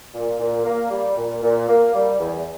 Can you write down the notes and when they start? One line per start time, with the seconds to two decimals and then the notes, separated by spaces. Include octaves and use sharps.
0.13 A#2
0.39 A#2
0.65 A#3
0.90 G3
1.16 A#2
1.42 A#2
1.68 A#3
1.94 G3
2.19 E2